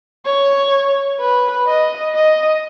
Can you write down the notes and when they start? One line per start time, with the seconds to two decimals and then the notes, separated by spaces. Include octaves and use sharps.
0.26 C#5
1.20 B4
1.67 D#5
2.15 D#5